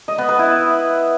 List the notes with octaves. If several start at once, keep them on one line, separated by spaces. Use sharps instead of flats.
D#5
B3
B4
E4